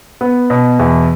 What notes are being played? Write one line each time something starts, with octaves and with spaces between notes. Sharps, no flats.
B3
B2
E2